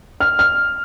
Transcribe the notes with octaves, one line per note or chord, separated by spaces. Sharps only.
F6
F6